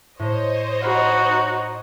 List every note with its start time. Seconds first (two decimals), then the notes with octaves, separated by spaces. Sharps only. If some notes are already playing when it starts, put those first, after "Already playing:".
0.19 A2 C5 C#5 D#5
0.82 D#4 F#4 F5 B5 E7